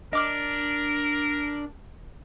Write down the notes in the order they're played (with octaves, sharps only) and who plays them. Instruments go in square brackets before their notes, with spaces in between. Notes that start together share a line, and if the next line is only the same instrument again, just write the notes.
[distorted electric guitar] D4 [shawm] A#4 [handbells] D#5 D6 F6